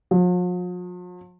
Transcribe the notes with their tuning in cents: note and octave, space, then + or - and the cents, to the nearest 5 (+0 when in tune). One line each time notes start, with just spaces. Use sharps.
F3 +45